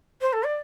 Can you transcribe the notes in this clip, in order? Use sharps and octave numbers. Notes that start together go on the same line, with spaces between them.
C5
A4
D5